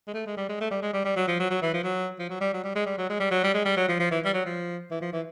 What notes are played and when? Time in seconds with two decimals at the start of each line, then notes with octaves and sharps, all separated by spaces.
0.07 G#3
0.14 A3
0.26 G#3
0.37 G3
0.49 G#3
0.60 A3
0.71 G3
0.82 G#3
0.93 G3
1.04 G3
1.16 F#3
1.28 F3
1.39 F#3
1.50 F#3
1.62 E3
1.73 F3
1.84 F#3
2.19 F3
2.30 F#3
2.41 G3
2.53 F#3
2.64 G3
2.75 G#3
2.86 G3
2.98 F#3
3.10 G#3
3.20 G3
3.31 F#3
3.44 G3
3.54 G#3
3.65 G3
3.77 F#3
3.88 F3
3.99 F3
4.11 E3
4.25 G3
4.34 F#3
4.45 F3
4.91 E3
5.01 F3
5.13 E3